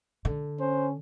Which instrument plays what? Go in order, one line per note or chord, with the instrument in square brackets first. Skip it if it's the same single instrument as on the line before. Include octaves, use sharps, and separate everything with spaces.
[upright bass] D3
[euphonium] C#4 [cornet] C5